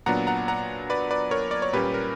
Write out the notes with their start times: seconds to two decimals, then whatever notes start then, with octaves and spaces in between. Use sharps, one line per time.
0.06 A#2 F#3 B3 D4 F#5 A#5
0.27 F#5 A#5
0.48 F#5 A#5
0.90 B4 D5
1.11 B4 D5
1.31 A#4 C#5
1.51 D5
1.62 C#5
1.73 A#2 G3 A#3 C#4 G4 B4
1.94 A#4